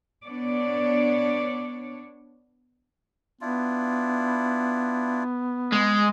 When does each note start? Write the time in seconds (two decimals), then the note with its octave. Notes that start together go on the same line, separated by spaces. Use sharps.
0.25 B3 D4 C#5 D5
3.41 B3 D4 E4 F4
5.73 G#3